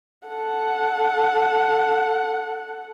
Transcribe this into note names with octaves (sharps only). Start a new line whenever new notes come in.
A4 F#5